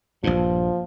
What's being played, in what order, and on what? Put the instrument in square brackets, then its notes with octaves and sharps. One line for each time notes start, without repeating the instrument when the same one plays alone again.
[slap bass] A#1 G2 [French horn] F3